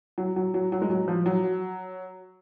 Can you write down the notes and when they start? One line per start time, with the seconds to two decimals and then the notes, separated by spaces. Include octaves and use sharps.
0.18 F#3
0.36 F#3
0.54 F#3
0.72 F#3
0.82 G#3
0.90 F#3
1.08 F3
1.26 F#3